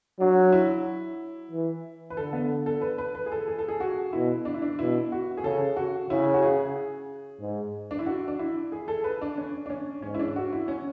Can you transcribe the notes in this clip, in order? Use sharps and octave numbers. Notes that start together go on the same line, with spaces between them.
F#3 D4
E4
E3
B4
D3 A4
B3
A4
B4
B4
B4
G#4
A4
G#4
A4
G#4
F#4
B2 E4
D4
E4
D4
B2 E4
F#4
G#4
C#3 A4
F#4
C#3 E4
F#4
G#4
G#2
D4
E4
F#4
D4
E4
G#4
A4
B4
D4
C#4
D4
C#4
G#2 C#4
E4
D4
F#4
E4
C#4